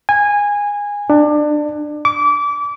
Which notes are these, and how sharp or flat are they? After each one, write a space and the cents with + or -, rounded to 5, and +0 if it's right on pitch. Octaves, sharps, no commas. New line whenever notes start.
G#5 -20
D4 +25
D6 -25